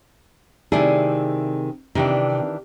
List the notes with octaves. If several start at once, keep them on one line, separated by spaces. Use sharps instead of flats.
C3 D#3 A3 E4 G#4 D5
C3 D#3 E3 D4